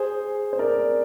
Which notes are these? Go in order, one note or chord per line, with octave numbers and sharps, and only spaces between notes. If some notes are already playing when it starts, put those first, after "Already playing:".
Already playing: G#4 C5
C5
A#4 D5